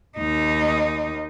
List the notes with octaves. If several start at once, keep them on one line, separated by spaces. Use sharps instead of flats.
D#2 D#4